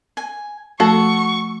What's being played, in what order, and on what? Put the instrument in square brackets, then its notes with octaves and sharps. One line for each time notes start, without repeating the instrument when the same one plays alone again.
[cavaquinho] G#5
[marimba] F3 A3 [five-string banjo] F#4 [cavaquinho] A4 [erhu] C#6